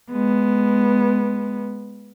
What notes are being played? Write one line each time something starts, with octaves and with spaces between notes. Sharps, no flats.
G#3 B3